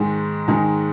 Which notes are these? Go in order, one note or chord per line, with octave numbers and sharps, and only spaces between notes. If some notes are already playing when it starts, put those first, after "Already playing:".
Already playing: G#2 D#3 G#3
G#2 D#3 G#3